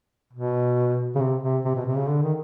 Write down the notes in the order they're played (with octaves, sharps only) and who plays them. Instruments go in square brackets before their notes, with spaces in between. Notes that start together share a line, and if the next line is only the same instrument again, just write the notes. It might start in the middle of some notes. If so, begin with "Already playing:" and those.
[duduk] B2
C#3
C3
C3
C3
B2
C3
C#3
D3
D#3